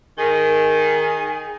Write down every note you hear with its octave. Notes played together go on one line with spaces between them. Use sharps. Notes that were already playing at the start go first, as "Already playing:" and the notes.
D#3 G#4